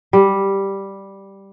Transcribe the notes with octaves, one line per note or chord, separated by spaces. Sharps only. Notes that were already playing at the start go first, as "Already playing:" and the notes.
G3